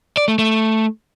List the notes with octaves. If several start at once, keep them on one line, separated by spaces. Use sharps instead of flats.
D5
A3
A3